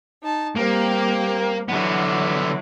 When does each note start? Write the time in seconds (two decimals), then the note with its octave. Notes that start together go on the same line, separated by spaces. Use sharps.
0.23 D#4 A5
0.55 G3 A#3 C4 G4
1.69 D3 E3 F#3 B3